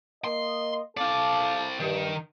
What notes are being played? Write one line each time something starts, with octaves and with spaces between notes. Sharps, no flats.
A#3 D#5 C6
C4 A4 D5 F5 A5
G2 D#3